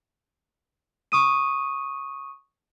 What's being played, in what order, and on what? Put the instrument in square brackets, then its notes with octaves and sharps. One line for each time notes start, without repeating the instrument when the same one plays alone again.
[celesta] C#6 D#6 D#7